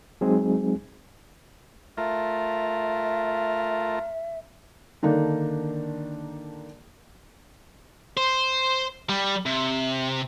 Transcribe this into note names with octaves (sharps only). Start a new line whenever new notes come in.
F#3 G#3 C4 D#4 G#4
A3 F4 A#4 E5
D3 D#3 A#3 D4 D#4
C5
G3
C3